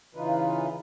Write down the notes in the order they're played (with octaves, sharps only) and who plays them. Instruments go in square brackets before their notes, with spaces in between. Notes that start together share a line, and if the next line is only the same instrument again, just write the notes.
[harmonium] C#3 E3 D#4 F4 B4